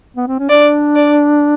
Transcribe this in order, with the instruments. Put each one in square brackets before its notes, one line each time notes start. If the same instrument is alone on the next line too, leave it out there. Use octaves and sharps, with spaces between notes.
[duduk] B3
C4
C#4
[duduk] D4 [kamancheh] D5
[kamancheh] D5